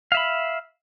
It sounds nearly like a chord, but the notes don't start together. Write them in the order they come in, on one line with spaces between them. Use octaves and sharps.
F5 E5 B5